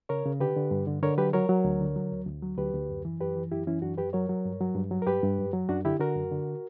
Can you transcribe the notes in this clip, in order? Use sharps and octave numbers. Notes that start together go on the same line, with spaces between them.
C#3 A#4 C#5
C#3
D3 G4 B4
D3
G2
D3
D3 A#4 C#5
F#3 G4 B4
F#3 A#4 C#5
F#3
D2
D3
F#3
D2
D2
F#3
D2 G4 B4
D2
F#2
E3
F#2 G4 B4
E3
F#2 E4 G4
E3 C#4 E4
F#2 D4 F#4
F#2 G4 B4
F#3 A#4 C#5
F#3
G2
F#3
G2
F#3
A#4
G2 G4 B4
G2
F#2
F#3
F#2 D4 F#4
D3 E4 G4
D3 F#4 A#4
F#2
D3